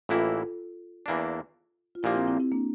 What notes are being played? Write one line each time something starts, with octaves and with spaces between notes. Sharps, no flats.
A1 A2 E3 A#3 E4 F4 A4
E2 E3 A#3 D4
F4
A#1 A#2 F3 A#3 E4 G4
C4 E4
C4 E4
C4 E4
A#3 D4